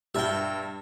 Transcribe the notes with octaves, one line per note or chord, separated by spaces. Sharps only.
G2 G4 E5 G5